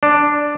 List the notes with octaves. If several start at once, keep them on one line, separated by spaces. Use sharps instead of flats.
D4